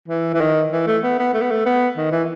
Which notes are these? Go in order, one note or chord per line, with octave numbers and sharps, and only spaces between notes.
E3
E3
D#3
E3
A3
B3
B3
A3
B3
A3
B3
D#3
E3